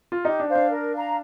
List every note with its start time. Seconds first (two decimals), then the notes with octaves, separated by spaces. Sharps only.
0.12 F4
0.24 D#4 G4
0.40 D4
0.48 C5 F5
0.55 D4
0.71 A#4
0.94 F5 A#5